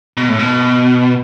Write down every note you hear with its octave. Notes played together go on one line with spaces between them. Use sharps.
B2
A2
B2